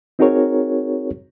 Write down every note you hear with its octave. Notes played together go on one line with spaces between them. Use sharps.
C4 D#4 F#4 G#4 A#4 C#5